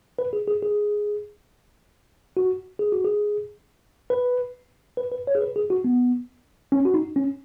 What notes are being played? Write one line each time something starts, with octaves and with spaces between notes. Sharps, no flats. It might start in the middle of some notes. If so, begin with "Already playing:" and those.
B4
G#4
G#4
G#4
F#4
G#4
F#4
G#4
B4
B4
B4
C#5
G#4
B4
G#4
F#4
B3
C#4
F#4
D#4
C#4